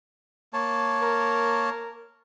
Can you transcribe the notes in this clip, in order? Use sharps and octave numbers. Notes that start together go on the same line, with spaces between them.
A#3 C#5 A5
A#4